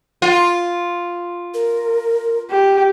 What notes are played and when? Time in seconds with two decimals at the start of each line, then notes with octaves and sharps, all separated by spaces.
0.22 F4
1.54 A#4
2.50 G4